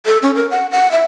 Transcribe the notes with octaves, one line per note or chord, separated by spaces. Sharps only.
A4
C#4
A#4
F#5
F#5
E5